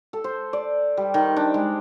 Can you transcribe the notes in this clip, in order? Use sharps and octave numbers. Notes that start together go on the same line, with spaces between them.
A4
C5
D5
G3
D#3
D4
G#3